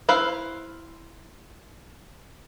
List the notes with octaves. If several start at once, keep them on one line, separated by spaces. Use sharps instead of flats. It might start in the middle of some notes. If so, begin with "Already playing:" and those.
E4 B4 C5 F5